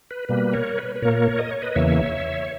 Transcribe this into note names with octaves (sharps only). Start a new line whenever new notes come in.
B4
B2 G3 A#3 B4
A#4 C#5
B4
B4
A#2 A#3 A#4 C#5
D#5
C#5
B4 D#5
E2 C#3 E3 A#3 C#5 E5